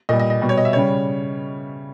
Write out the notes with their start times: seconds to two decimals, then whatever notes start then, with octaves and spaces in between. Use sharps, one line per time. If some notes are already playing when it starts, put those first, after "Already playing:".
0.09 A#2 G3 D#5
0.20 D#5
0.30 D#5
0.41 B2 G3
0.49 C#5
0.58 D#5
0.65 E5
0.73 C#3 G3 C#5